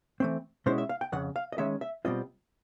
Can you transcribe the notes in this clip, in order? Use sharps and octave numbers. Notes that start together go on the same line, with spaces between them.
E3 A3 C4
B2 G#3 C#4 E4 C5
E5
F5
G5
F2 C#3 F#5
F5
D#5
D#3 G#3 C#4 E5
E5
B2 G3 C4 F4 D#5